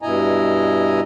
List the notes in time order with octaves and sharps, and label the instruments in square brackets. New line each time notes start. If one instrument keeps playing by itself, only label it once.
[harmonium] G2 B2 E4 D#5 G#5 A#5